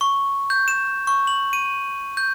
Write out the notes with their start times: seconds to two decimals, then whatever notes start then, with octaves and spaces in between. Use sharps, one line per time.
0.01 C#6
0.50 G6
0.68 E7
1.07 C#6
1.27 F#7
1.53 D#7
2.17 G6